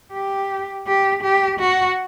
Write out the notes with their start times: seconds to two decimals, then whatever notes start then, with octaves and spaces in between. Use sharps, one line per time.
0.13 G4
0.87 G4
1.23 G4
1.59 F#4